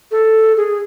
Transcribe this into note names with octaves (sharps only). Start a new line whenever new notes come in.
A4
G#4